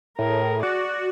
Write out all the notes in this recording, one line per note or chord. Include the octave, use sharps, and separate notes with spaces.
A2 G#4 A#4
F#4 D5